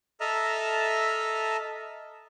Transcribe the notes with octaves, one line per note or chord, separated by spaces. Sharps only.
A4 D#5 E5 A5 A#5 F6